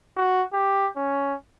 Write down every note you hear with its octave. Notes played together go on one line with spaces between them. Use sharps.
F#4
G4
C#4